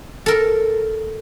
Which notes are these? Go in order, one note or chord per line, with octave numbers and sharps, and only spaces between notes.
A4 A#4